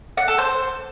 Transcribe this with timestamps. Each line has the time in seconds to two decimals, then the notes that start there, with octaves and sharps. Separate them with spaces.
0.17 F#5
0.28 A4
0.38 C5